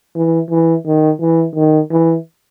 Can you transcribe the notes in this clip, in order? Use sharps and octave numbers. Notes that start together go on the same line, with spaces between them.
E3
E3
D#3
E3
D#3
E3